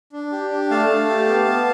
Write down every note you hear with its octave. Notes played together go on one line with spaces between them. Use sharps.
D4
G4
D4
A3 F5 A5
A3
G4
B3
B3